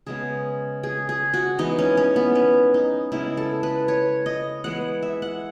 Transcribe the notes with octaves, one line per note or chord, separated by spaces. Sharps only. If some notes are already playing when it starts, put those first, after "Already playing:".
C#3 G#3 B3 G#4
G#4
G#4
F#4
E3 G#3 B3 D#4
C#4
C#4
B3
C#4
D#4
C#3 G#3 B3 E4
A4
B4
C#5
D#5
E3 G#3 B3 F#5
E5
F#5